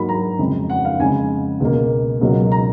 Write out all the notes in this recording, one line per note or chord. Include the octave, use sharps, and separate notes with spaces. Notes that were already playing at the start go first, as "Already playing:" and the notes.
Already playing: G#2 F#3 A#3 B5
A#5
F2 C#3 G#3
F#5
F5
F2 C#3 G#3 G#5
C#2 B2 A#3
C#2 B2 F#3 A#3
A#5